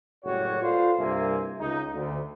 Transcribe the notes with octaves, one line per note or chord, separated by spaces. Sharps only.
F#1 A2 G3 F#4 C#5
F4 A4 B4 C5 D5 F5
C2 G2 A#3 C5 E5 G#5
C#2 D#4
D2